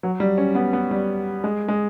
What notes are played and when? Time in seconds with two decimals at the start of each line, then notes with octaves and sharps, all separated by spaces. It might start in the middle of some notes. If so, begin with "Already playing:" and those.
0.03 F#3
0.20 G3
0.38 C#4
0.55 B3
0.73 B3
0.91 G3
1.44 G#3
1.68 G#3